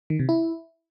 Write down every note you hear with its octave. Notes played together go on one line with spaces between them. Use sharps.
D#3
C3
E4